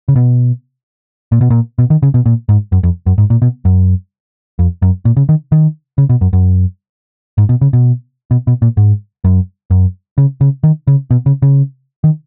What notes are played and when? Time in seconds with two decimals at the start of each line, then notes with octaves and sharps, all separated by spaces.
0.08 C#3
0.16 B2
1.32 A#2
1.41 B2
1.50 A#2
1.79 B2
1.90 D#3
2.03 C#3
2.14 B2
2.26 A#2
2.49 G#2
2.72 F#2
2.83 F2
3.06 F#2
3.18 G#2
3.30 A#2
3.42 B2
3.65 F#2
4.59 F2
4.82 F#2
5.05 A#2
5.17 C#3
5.29 D#3
5.52 D#3
5.98 C#3
6.09 B2
6.21 F#2
6.33 F#2
7.38 G#2
7.49 B2
7.61 C#3
7.73 B2
8.31 B2
8.47 B2
8.62 A#2
8.77 G#2
9.24 F#2
9.71 F#2
10.18 C#3
10.41 C#3
10.64 D#3
10.87 C#3
11.11 B2
11.26 C#3
11.42 C#3
12.04 D#3